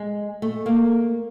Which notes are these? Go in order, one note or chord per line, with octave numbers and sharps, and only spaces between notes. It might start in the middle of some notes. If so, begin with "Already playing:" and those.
Already playing: G#3
A3
A#3